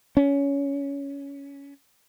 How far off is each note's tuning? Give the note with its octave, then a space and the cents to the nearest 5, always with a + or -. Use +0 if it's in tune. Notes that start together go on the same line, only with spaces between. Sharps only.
C#4 +15